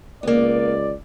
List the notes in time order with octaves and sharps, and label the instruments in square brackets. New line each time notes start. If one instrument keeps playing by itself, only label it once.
[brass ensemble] C#2 D5 [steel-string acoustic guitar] A#3 B3